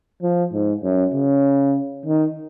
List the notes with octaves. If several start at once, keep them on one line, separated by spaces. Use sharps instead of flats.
F3
G#2
F#2
C#3
D#3